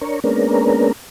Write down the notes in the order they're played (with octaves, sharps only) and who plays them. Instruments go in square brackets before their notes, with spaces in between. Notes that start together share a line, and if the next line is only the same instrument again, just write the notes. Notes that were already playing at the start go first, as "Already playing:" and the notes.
[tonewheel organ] D4 A#4 C#5
G#3 A#3 B3 C#4 D4 A#4